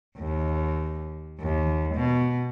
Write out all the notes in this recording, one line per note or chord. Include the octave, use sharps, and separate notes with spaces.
D#2
D#2
B2